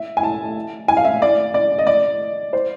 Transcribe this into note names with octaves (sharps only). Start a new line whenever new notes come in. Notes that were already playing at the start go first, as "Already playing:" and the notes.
Already playing: E5
G#5
A5
G#5
F5
E5
D5
D5
D#5
D5
C5